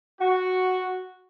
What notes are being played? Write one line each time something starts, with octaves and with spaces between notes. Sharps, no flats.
F#4